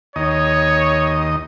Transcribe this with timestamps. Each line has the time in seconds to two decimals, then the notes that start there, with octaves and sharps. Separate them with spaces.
0.16 D#2 C#5 D#5